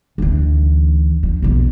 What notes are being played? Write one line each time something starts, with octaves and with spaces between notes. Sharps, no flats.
D2 E3
F3
B1 E2